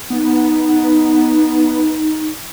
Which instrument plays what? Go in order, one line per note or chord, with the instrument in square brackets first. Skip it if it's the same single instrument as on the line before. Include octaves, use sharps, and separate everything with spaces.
[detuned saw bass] B3 [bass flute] D#4